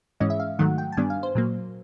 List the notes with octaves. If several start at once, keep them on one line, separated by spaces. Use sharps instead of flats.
G#2 E3 G#3 C#4 D#5
E5
F5
G#2 D#3 F#3 A3 F#5
G5
A5
G2 D#3 G3 B3 D4 G#5
F5
C5
A#2 F#3 A#3